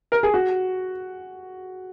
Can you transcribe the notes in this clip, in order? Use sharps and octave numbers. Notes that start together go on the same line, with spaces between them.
A#4
G#4
F#4